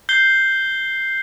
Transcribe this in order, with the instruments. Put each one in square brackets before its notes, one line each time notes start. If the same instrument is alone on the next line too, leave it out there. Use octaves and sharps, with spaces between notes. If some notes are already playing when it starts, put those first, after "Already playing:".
[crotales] G6 C7 G7